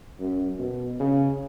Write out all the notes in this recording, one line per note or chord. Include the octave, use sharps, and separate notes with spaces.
F#2
B2
C#3